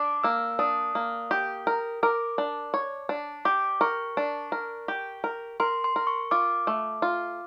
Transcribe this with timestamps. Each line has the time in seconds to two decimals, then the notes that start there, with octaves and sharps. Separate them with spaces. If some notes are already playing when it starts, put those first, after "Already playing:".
Already playing: D4 D6
0.24 A#3 E6
0.59 D4 D#6
0.95 A#3
1.31 G4
1.67 A#4
2.03 A#4 D6
2.38 D4
2.74 C#5
3.09 D4
3.45 G4 D6
3.81 A#4 C#6
4.17 D4
4.52 A#4
4.88 G4
5.24 A#4
5.60 A#4 C6
5.84 C6
5.96 A#4
6.07 C#6
6.31 F4 D6
6.67 A3
7.02 F4